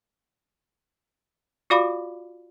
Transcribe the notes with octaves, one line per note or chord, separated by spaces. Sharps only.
F4 F#4 D5 F5 B5 D6